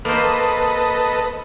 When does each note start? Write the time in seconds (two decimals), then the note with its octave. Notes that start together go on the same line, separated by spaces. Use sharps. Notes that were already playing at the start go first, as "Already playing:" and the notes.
0.05 A#3 A4 B4 C5 D#5